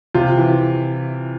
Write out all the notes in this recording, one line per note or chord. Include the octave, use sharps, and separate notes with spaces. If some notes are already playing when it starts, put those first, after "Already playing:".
C3 F4
E3